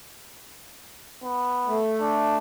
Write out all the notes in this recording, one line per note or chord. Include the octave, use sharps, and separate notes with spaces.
B3
A3
D4